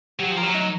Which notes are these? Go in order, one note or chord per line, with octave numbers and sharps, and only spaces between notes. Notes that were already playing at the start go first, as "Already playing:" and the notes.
F#3 G4
F3
A#4
F#3
D#4